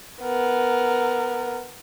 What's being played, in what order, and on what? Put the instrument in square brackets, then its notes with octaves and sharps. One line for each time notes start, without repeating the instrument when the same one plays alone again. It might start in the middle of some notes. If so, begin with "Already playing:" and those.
[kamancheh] B3 A#4